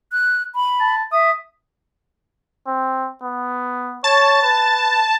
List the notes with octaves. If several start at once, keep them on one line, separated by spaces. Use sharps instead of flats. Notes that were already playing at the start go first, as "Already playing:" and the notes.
F#6
B5
A5
E5 D#6
C4
B3
C#5 A5
B4